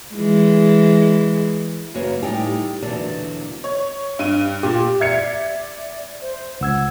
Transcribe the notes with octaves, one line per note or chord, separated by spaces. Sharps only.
E3 G#3
F#2 C#3 A#3 F#4 B4 C#5
A2 G3 D#4 G4 G5 G#5
E2 B2 D3 F#3 A#3 D5
C#5
G2 D#7
A#2 G4
D5 E5 G#6 C#7
C5
C#2 F#5 E6 G#6